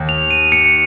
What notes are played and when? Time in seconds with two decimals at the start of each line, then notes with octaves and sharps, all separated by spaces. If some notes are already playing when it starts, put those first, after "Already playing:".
Already playing: D#2
0.09 F7
0.30 D#7
0.52 C#7